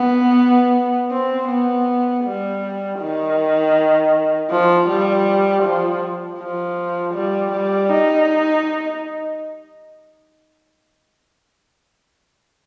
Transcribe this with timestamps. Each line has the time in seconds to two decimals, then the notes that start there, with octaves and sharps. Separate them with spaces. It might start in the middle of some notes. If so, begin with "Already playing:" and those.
Already playing: B3
1.11 C4
1.49 B3
2.24 G3
3.00 D#3
4.50 F3
4.88 G3
5.63 F3
6.39 F3
7.14 G3
7.52 G3
7.89 D#4